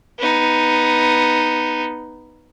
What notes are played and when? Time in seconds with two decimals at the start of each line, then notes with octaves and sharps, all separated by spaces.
0.19 B3 D#4